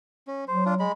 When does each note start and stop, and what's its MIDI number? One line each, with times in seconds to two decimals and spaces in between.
0.27 0.45 61
0.48 0.86 54
0.48 0.64 72
0.66 0.74 62
0.66 0.74 65
0.80 0.92 56
0.80 0.92 83